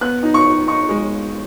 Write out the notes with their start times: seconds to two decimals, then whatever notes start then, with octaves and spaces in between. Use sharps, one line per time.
0.01 B3 F#6
0.23 D#4
0.34 C#6
0.45 D#4
0.67 D#4 C#6
0.89 G#3